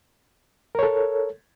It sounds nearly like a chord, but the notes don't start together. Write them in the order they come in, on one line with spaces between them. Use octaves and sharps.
A#4 C#5 A4